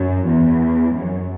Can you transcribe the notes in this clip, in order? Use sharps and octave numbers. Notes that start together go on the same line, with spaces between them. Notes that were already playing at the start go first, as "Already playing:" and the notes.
Already playing: F#2
E2
F#2